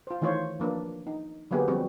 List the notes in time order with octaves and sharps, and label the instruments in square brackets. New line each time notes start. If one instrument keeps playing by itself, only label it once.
[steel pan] F4 C5
D#3 E3 A3 F4 C5 C#5
F3 A#3 D4 B4
D#4
D3 F#3 A#3 B3 G4 G#4
F3 G3 C4 F#4